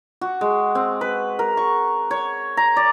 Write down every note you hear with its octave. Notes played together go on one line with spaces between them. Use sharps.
F#4
G#3
C4
B4
A#4
C#6
C#5
A#5
D5